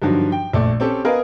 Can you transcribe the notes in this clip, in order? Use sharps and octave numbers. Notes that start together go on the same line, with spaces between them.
G2 D3 D#3 F3 F#3
G5
A#1 A3 D5
C4 C#4 G4 A4
B3 G#4 A#4 B4 D#5 F5